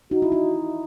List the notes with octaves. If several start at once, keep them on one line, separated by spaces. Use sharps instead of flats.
D#4 F#4
E4
D#4